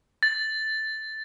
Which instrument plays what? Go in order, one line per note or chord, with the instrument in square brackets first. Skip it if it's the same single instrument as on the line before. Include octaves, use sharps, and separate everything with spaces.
[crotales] A6